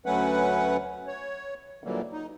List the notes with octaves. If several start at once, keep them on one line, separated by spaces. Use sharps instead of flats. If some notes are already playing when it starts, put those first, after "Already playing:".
D2 F#3 A3 C#4 B4 F#5
C#5
A#2 D3 E3 F#3 G3 A#3
D#4